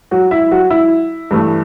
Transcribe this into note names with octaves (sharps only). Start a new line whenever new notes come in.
F#3 F#4
E4 E5
F#3 F#4
E4
G2 E3 A3